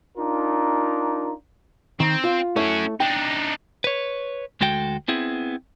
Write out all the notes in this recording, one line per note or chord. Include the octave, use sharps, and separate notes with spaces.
D4 D#4 F4 A#4
D#3 C4
F4
A3 C#4 E4 F#4 C#5
D4 D#4 G5
B4 C#5
D2 G#3 F#4 A4 G5
B3 C4 E4 G#4